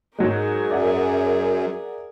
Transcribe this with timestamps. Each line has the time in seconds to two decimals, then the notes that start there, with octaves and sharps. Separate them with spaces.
0.19 G#2 F#3 G#3 G#4 A#4
0.71 F#2 D5 E5 F#5